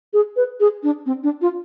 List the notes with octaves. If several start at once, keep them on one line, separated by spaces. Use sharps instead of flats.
G#4
B4
G#4
D4
C4
D4
F4